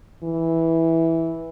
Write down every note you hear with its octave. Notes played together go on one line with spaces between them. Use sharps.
E3